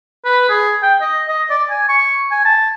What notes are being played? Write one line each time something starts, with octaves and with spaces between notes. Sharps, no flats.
B4
G#4
G5
D#5
D#5
D5
G#5
C#6
G#5
A5